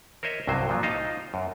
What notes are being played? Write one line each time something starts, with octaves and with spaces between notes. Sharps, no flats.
A#4 C5 C#5 D#5 E5
C2 G2 C3 F#3 C5
A#2 F3 F#3
D#4 F4 C5 D#5 F5
F#2